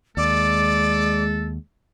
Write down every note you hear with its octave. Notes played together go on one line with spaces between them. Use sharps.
D#2 G#3 A4 D5